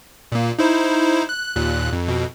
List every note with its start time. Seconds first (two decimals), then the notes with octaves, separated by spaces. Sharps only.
0.32 A#2 A#3
0.59 D#4 E4 C5
1.29 F#6
1.56 D#2 A#2 F#6
1.93 F2
2.06 F2 B2